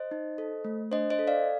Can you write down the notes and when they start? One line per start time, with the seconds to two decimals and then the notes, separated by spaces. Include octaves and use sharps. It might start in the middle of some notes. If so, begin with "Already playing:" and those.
Already playing: C5 D#5
0.11 D#4
0.38 A4
0.65 A3
0.92 D4 C5 D#5
1.10 C5 D#5
1.19 A4
1.27 D5 F5